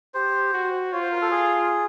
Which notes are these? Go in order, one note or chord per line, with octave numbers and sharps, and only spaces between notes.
G4 C5
F#4
F4 C#5
C5
A#4
A4
G#4